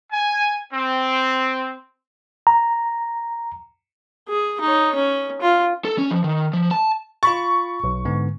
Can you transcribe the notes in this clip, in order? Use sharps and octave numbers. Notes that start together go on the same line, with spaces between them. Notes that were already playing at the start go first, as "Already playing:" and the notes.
G#5
C4
A#5
G#4
D#4 C#5
C#4
F4
A4
C#4
F3
D#3
F3
A5
F4 B5 C#6 A6
B1
G#2 D3 B3